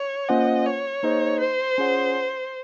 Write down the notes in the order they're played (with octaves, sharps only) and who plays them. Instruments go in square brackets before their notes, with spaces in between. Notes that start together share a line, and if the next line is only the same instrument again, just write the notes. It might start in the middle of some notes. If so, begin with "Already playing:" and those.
Already playing: [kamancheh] C#5
[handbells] A#3 C#4 F4 C5 F#5 [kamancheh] D#5
[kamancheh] C#5
[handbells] A#3 D#4 G#4 C5 D#5
[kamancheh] C5
[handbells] C#4 F4 G#4 C#5 F#5